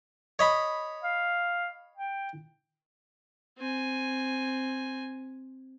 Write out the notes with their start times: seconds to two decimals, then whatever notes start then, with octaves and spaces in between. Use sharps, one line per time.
0.39 C#5 D#5 B5
1.03 F5
1.97 G5
3.58 C4 G#5